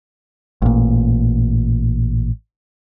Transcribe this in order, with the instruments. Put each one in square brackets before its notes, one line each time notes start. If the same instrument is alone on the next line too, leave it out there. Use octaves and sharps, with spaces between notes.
[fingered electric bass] A1 A#2